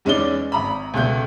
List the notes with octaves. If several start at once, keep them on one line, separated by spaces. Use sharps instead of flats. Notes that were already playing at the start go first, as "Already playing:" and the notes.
E2 G#3 C#4 D#4 D5 G7
G#1 A#5 B5
C#2 B2 A3 G6